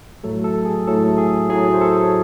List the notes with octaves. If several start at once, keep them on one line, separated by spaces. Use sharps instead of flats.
A2 F#3 A3 A4
A4
G#4
A2 F#3 A3 A4
G#4
A2 F#3 A3 G#4
C5
A4
C#5